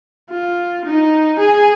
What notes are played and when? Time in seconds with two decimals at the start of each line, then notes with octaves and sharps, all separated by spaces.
0.30 F4
0.85 D#4
1.40 G#4